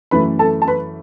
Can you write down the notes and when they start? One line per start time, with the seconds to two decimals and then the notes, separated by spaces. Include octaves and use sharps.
0.11 F#2 E3 A3 B4 B5
0.39 A4 A5
0.62 A5
0.68 B4 B5